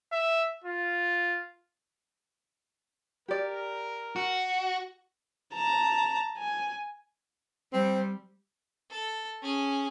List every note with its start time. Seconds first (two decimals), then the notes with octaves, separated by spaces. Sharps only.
0.12 E5
0.64 F4
3.28 G4 A#4 D5
4.16 F#4
5.54 A5 A#5
6.39 G#5
7.73 G3 C4
8.90 A4
9.42 C#4 G#4